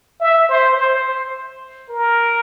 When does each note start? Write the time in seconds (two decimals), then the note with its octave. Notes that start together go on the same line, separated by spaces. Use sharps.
0.21 E5
0.49 C5
0.77 C5
1.90 A#4